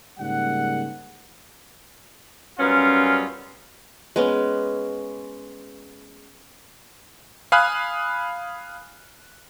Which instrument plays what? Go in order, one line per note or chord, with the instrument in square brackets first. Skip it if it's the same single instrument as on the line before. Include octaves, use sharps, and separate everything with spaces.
[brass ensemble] G#2 C#3 G3 A#3 F#5
[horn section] F#2 G3 B3 C#4 F4
[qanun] G#3 B3 C#4
[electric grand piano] F5 G#5 B5 D#6 F6 F#6